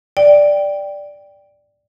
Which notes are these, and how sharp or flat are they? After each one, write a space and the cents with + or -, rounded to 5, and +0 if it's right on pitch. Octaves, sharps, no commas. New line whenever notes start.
D5 +0 G5 +0